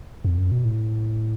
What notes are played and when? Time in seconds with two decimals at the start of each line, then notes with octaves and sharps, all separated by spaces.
0.25 F2
0.38 F#2
0.52 B2
0.65 A2